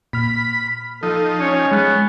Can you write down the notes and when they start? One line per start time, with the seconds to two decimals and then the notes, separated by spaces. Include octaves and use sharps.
0.13 A#2 B5 F6
1.03 F3 D#4 A4
1.40 C#4 C#5
1.71 G#3 B3